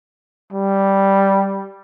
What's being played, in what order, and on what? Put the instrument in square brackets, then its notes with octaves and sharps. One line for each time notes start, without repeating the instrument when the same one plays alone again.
[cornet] G3